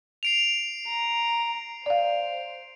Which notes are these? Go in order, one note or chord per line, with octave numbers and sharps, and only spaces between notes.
C7 D7 F7
A#5
C5 D5 F5